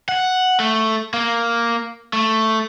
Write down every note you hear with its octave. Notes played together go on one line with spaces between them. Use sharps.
F#5
A3
A#3
A3